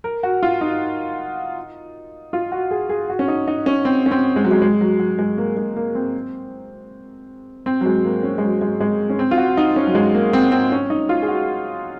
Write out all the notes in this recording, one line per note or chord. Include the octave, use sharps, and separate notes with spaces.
A#4
F#4
F4
D#4
F4
F#4
G#4
G#4
F#4
C#4
D#4
D#4
C#4
C4
C#4
C4
G#3
F#3
G#3
G#3
F#3
F#3
G#3
A#3
G#3
A#3
C4
C4
F#3
G#3
A#3
C#4
G#3
F#3
G#3
G#3
C#4
C4
F4
F#4
D#4
C#4
F#3
G#3
A#3
C4
C4
C#4
D#4
F4
G#4
F#4